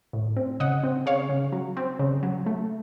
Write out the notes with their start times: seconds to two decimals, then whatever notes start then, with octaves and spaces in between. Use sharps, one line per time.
0.13 A2
0.37 C4
0.60 C#3 D#5 F#5
0.83 C4
1.06 C#3 C#5 F5
1.29 C#3
1.52 F#3
1.77 C4
1.99 C#3
2.23 F#3
2.46 A3